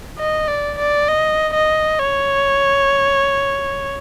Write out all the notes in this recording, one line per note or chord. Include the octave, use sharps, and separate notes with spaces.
D#5
D5
D5
D#5
D#5
C#5